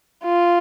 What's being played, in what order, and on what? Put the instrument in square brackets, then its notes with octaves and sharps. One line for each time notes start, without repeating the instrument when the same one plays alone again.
[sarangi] F4